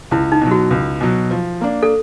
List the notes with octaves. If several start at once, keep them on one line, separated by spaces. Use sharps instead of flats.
C#2 E4
D#4
B2 F#3
F#4
C#2
B2 F#3
F3
A#3 D4
A4